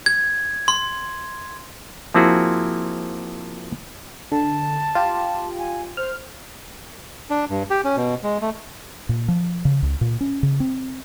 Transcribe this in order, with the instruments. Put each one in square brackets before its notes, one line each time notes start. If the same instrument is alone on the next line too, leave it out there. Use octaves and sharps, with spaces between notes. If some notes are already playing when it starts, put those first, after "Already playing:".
[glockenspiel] G#6
C6
[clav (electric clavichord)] F3 A#3 C4 E4 F#4 G#4
[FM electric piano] D3 [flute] A5
[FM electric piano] F4 G4
[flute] G#5
[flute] C5 [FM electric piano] F6
[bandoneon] D4
G2
G4
C#4
B2
G#3
A3
[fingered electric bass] A#2
F3
C#3
C#2
A#2
C#4
C#3
C4